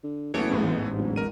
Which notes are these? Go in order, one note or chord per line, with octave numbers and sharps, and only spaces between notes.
D3
F#1 E2 E3 A3 B3 C#5 D7
A1 E2 G#2
D1
A#4 D#7